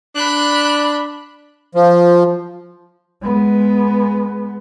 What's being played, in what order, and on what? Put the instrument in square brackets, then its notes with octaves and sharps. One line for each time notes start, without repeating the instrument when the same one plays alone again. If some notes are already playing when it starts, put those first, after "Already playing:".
[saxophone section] D4 [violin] B5 F#6
[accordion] F3
[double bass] G#3 B3